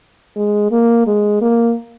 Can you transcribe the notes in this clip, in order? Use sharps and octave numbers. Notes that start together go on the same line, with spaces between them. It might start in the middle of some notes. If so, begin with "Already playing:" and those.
G#3
A#3
G#3
A#3